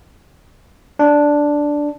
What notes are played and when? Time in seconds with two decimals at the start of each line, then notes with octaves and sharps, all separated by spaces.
0.99 D4